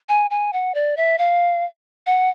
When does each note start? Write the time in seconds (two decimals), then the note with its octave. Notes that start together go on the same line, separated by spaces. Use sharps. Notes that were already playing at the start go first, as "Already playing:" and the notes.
0.09 G#5
0.30 G#5
0.53 F#5
0.75 D5
0.97 E5
1.18 F5
2.06 F#5